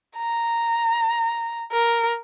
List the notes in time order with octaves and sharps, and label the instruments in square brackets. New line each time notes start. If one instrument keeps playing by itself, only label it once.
[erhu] A#5
A#4